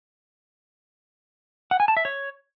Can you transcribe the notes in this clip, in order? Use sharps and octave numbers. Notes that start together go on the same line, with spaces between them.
F#5
G#5
A5
E5
C#5